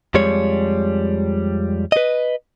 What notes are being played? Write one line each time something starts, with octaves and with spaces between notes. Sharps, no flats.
F2 F3 G3 G#3 C#5
B4 D#5